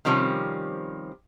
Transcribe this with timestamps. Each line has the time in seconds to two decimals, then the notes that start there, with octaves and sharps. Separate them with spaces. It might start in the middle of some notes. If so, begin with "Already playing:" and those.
0.05 C3 D#3 F3 G3 C4 C#4